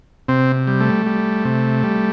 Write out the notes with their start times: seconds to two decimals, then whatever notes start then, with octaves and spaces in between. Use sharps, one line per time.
0.28 C3 C4
0.67 G3
0.80 A3
1.06 G3
1.45 C3
1.83 G3